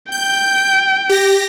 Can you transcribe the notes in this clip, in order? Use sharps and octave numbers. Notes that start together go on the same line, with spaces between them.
G5 G6
G4 A#6